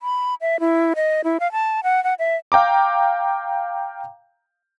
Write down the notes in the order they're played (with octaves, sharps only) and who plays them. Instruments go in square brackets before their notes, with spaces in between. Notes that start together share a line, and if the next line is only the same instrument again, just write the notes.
[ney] B5
E5
E4
D#5
E4
F5
A5
F#5
F#5
E5
[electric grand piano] F5 G5 A#5 D6